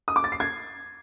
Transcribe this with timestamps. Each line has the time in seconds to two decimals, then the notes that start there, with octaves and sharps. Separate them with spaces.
0.08 D#6
0.16 D6
0.24 A6
0.32 C7
0.40 G#6